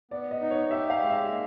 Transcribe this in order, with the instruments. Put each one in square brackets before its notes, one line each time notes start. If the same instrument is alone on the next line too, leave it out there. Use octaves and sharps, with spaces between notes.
[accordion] B3 [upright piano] D5
[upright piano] D#5
[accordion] D#4
[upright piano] C#5
[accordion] G4 [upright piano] E5
[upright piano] F5
[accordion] G#3
[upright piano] E5
[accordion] A#3